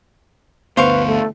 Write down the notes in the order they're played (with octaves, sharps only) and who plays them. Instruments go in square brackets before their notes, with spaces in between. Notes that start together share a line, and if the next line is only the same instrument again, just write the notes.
[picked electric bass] G1 D2 B3 [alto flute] B4 [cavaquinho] C5 F5 C#6
[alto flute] A3